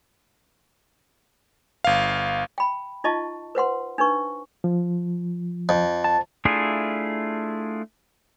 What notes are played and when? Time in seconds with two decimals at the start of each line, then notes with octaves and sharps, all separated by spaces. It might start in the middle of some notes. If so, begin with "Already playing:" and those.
1.84 G1 F5
2.58 G5 B5
3.04 D#4 F4 D#5 A5 C#6
3.55 B4 C5 F#5 C6
3.98 D4 D#4 B4 C#6
4.64 F3
5.69 F2
6.04 A5
6.45 A3 D4 E4 F4 G#4